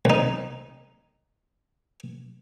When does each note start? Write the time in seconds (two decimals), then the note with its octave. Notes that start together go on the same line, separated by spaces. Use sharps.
0.05 C2 D#4